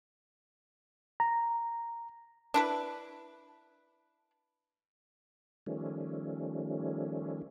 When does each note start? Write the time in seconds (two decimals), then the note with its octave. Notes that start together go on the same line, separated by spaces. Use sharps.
1.20 A#5
2.54 D4 E4 B4
5.66 D#3 F3 G3 A3 C#4